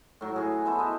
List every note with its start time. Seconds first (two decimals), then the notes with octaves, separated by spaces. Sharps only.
0.21 A2 F#3
0.36 F#4 G#4
0.65 B3 E4 A4 C5
0.78 B4 C5 D#5 E5